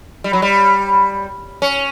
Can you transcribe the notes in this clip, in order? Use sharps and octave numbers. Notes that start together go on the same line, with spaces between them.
G3
F#3
G3
C#4